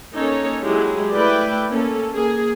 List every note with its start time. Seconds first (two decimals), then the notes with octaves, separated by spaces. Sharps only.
0.14 A#3 C#4 D#4 A4 C#5
0.63 F#3 G#3 E4 G4 G#4
1.14 A3 E4 B4 D5 G5
1.69 A#3 C#4 A4
2.15 A#3 G#4